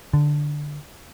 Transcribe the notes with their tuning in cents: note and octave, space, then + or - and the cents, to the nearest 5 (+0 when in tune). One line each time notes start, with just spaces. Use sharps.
D3 +5